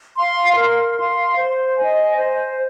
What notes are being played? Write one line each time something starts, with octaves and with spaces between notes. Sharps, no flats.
F5 C6
A#4
F5 C6
C5
D#5 G#5
C5